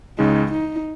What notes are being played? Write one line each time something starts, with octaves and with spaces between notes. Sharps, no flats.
C#2 C#3 G#3 D#4
D#4